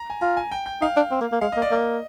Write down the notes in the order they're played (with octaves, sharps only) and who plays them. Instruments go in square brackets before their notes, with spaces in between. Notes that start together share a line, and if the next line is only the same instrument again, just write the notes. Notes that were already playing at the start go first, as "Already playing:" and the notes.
Already playing: [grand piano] A#5
G#5
[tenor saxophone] F4 [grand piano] A#5
[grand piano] G#5
G5
G5
[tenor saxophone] D#4 [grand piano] F5
[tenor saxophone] D4
C4
A#3
A#3
[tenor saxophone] G#3 [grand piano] F5
[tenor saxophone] A#3 [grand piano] D#5
[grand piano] D5
[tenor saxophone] A#3 [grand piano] D#5